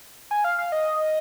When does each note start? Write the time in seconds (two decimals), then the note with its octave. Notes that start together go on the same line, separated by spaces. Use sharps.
0.31 G#5
0.44 F5
0.59 F5
0.72 D#5